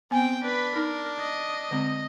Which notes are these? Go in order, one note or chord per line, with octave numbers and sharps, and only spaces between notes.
B3 C4 G5 G#5
D4 B4 B5
D#4 A#4
D#5
D3 G#3 C4